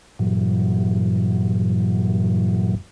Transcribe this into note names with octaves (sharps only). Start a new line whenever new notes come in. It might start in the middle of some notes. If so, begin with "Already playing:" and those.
G2 A#2 E3 F#3